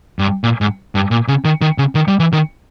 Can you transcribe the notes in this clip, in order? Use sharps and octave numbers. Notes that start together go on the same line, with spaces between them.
G2
A#2
G#2
G2
A#2
C#3
D#3
D#3
C#3
D#3
G3
E3
D#3